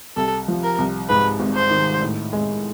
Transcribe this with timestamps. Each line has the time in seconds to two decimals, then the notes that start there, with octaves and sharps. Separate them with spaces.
0.16 C2 A4
0.48 F3
0.64 A#4
0.78 C2
1.09 G#2 B4
1.40 G#1
1.55 C5
1.70 D#3
2.02 A2
2.33 G#3